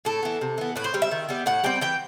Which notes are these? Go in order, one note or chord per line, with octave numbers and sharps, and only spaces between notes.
A2 A4
E3 B3
C3
E3 B3
A2 B4
C5
G3 C4
E5
D#3
G3 B3
A2 F#5
G3 C4 G5
E3 G5